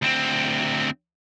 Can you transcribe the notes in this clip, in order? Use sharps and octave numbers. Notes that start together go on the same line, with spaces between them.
D2 C4